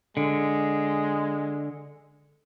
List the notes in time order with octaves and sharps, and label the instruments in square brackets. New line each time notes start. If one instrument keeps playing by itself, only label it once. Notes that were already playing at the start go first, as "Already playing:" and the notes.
[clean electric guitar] D3 [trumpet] G#3